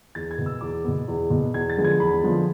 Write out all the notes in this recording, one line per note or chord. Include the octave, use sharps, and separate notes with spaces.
E2 A6
G#6
B2 B3
E6
E2 D6
B2 B3
E2
B2 B3
E2 G#6
A6
D3 F3 G#3 B3
G#6
E2 B5
D3 F3 G#3 B3